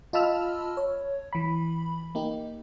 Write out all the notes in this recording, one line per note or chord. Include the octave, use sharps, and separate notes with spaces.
F4 D#5 A5 B5 E6 F6
C#5
E3 B5
A#3 D#4 G4